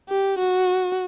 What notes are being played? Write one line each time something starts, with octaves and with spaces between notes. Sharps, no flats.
G4
F#4